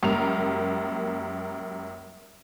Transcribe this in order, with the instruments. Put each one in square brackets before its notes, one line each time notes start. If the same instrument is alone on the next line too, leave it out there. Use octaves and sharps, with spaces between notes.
[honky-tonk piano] C#2 F#2 G3 A#3 A#4 F7